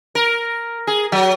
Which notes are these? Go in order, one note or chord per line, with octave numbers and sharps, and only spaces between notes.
A#4
G#4
F#3